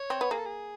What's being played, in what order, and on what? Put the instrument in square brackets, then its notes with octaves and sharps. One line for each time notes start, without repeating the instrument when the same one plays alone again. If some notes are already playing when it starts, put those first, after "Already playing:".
Already playing: [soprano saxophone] C#5
[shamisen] C4
B3
[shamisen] A#3 [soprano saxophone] G#4
[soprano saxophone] A4
G#4